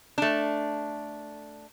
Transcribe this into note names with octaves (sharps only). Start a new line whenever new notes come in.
A3 D4